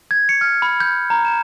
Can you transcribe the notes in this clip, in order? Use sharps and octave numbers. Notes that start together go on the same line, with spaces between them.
G#6
C#7
F6
B5
G6
A#5
E7